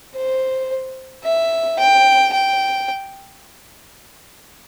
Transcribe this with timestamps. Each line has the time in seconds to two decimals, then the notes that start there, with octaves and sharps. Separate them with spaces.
0.16 C5
1.24 E5
1.79 G5
2.33 G5